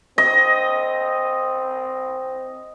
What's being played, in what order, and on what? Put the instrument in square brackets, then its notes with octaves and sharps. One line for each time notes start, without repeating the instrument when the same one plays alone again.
[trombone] C4 [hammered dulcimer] D#5